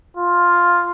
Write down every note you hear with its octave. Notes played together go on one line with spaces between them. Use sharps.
F4